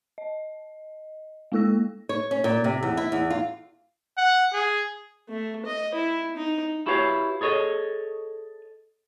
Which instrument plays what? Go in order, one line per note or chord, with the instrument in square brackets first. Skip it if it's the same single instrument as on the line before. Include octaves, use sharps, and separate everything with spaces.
[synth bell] D#5
G#3 A#3 E4 A4 E6 A#6
[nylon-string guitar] C#5
C#4
A#2
C3
E2
E4
E2
F4
[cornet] F#5
G#4
[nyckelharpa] A3
D#5
E4
D#4
[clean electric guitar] E4 F#4 G4 B4 C#5 F5
G#4 A4 C#5 D#5